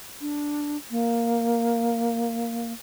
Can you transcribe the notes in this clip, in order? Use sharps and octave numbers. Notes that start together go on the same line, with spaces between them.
D4
A#3